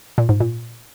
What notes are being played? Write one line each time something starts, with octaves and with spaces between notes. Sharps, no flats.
A#2
G#2
A#2